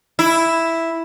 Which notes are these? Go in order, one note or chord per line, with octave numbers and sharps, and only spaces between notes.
E4